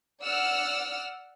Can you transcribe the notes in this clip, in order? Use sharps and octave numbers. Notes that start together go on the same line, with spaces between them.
D5 F#5 E6 F6